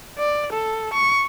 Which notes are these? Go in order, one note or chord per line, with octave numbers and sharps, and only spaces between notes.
D5
A4
C#6